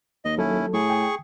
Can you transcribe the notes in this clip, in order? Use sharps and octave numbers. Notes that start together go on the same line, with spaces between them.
D#2 D#5
F#3 C#4 E4 A4
A2 G#4 C#6
G5 G#5 D#6